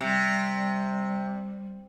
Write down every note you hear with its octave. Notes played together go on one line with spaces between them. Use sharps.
C3 G3